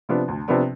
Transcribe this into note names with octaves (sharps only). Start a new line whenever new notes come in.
C3 F3 B3 D4
D2
C3 F3 B3 D4